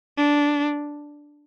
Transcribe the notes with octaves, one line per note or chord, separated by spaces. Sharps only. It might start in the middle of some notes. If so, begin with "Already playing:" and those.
D4